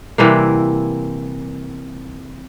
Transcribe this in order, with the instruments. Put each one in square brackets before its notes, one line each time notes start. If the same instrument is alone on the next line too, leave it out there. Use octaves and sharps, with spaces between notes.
[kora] C3 E3 G3 A#3